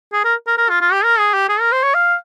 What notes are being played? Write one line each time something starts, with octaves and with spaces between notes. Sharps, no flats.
G#4
A#4
A#4
A#4
F4
F4
G4
A#4
G#4
G4
G#4
A#4
C5
C#5
F5